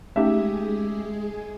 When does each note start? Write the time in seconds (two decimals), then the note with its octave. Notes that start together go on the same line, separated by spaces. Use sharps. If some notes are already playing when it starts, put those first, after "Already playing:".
0.16 G#3 A3 C#4 D#4 G4 G#4 E5